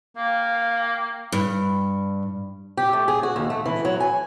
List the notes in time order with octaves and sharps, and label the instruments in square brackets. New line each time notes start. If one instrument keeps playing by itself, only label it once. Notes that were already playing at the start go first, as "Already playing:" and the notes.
[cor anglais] A#3 [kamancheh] F5 G5
[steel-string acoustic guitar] G2
G4
A3
G#4
F#4
D#2
A3
E3
F#3
G#5